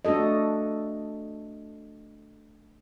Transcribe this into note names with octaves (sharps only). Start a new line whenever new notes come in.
A3 D4 F#4 A4 D#5